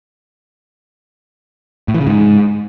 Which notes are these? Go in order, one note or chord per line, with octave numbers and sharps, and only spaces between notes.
A2
E3
C#3
G#2